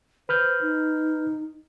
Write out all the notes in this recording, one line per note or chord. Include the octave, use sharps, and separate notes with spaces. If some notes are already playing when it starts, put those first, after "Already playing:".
B4 C5 F6 G6
D#4